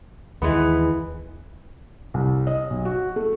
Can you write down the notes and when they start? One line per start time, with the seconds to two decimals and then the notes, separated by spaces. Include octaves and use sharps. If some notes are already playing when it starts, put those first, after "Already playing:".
0.42 D#2 E3 G#3 B3
2.14 C2
2.47 D#5
2.70 B1
2.85 F#4
3.16 A3